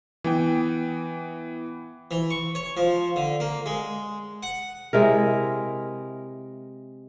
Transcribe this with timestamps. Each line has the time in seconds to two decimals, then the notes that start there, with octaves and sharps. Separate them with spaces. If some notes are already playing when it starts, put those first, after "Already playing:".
0.24 E3 B3 G5
2.11 E3
2.31 C#6
2.55 C#5
2.77 F3
3.16 D3
3.40 A#3
3.66 G#3
4.43 F#5
4.93 C3 G#3 E4 A#4